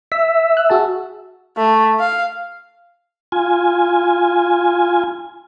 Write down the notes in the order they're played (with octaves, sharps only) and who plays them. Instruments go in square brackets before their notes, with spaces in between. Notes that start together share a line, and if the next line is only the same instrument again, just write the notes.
[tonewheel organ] E5 [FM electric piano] B6
[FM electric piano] F#6
F#4 G#4 A5
[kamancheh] A3
F5
[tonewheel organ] F4 G#5